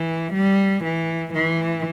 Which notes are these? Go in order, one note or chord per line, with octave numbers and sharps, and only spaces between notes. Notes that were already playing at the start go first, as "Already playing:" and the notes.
Already playing: E3
G3
E3
E3